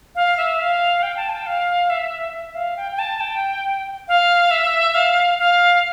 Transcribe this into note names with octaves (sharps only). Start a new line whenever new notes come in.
F5
E5
F5
G5
A5
G5
F5
E5
E5
F5
G5
G5
A5
G5
F5
E5
F5
F5